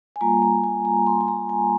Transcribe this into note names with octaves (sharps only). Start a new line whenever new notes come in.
G#5
G3 A#3 F4 A#5
A#5
G#5
A#5
C6
G#5
A#5
G#5